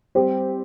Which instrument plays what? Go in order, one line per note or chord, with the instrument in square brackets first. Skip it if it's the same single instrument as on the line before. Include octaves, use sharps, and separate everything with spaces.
[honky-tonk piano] G3 C4 G4